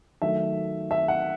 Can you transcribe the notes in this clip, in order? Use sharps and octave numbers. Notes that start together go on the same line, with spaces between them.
D#3 F#3 A3 E5
E5
F#5